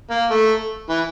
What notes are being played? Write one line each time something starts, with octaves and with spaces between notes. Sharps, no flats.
A#3
A3
E3